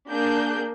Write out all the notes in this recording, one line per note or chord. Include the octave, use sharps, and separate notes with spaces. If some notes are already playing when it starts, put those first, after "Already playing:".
A#3 D4 G#4 G6